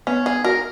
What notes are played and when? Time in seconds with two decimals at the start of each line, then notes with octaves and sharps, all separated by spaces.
0.07 B3 C#4
0.26 G#4
0.44 F#4 A#4